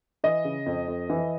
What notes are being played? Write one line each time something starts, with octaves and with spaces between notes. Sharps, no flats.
E3 D#5
C#3
F2
F2
E3